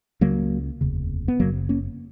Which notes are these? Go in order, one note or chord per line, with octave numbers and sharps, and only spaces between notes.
C#2 C#3 F#3 A#3
F1 D#2 C#3
B3
F#1 F#2 C#3 F#3 A#3
A#3 C#4